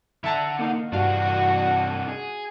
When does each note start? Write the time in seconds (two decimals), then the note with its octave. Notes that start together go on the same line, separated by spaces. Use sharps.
0.24 D3 E5 A5 A#5
0.59 A#3 D#4 F5
0.92 C2 G2 D4 F#4 F5
2.09 G#4